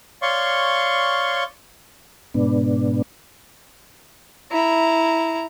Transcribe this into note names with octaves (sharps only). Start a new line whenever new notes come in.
C#5 D5 F5 C6 C#6
G#2 B2 B3 D4
E4 A#5